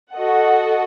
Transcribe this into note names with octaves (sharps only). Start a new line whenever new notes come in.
F#4 A4 D#5 F#5